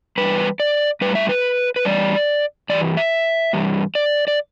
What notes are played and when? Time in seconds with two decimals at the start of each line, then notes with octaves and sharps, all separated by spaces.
0.18 E2 B2 G3 B4
0.60 D5
1.01 A2 G3 B4
1.15 E5
1.29 B4
1.76 B4
1.85 E2 E3 G3 D5
2.70 G2 E3 G3 D5
2.97 E5
3.53 G2 E3 G3
3.95 D5
4.28 D5